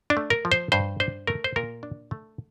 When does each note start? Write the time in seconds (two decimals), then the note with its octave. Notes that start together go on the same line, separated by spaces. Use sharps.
0.10 D4
0.17 A3
0.30 A#4
0.45 F3
0.52 C5
0.72 G2 C5
1.00 D4 C5
1.27 A3 A#4
1.44 C5
1.56 A#2 A#4
1.83 D4
2.11 A3